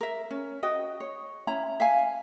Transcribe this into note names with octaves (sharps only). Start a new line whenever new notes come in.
A#4 E5
C#4
F#4 D#5 G5
C#5
C#4 E4 A#5
E5 F5 G#5